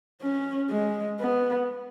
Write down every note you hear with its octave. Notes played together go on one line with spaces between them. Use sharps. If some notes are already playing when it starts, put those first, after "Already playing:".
C#4
G#3
B3